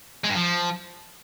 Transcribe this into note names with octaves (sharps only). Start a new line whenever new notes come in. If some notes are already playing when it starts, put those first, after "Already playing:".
G#3
G2
F3